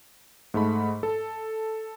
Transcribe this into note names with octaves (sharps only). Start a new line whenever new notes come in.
G#2 A3 B5
A4